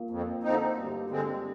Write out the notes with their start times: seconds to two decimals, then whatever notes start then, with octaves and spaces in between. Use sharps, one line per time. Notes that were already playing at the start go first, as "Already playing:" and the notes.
Already playing: A#2
0.10 F2
0.43 D3 F3 C4 D#4
0.76 D2 G2
1.10 D3 G#3 C4